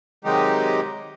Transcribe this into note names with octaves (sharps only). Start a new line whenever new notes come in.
C3 D#3 F#3 G#3 D#4 G4